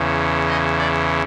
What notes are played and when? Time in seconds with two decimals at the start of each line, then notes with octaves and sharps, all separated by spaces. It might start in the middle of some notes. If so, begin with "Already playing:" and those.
Already playing: E2 C#3 E3
0.48 D#5
0.79 D5